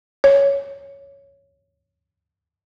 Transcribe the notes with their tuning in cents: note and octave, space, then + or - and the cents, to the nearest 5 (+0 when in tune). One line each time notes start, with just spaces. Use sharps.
C#5 +5